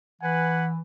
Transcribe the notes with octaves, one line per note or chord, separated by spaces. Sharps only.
E3 B4 F#5 G#5